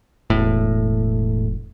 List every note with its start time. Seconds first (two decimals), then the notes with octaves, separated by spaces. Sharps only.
0.30 E1 A2